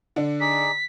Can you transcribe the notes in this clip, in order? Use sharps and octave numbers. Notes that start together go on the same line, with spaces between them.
D3 D4
D#4 G#4 D5 B6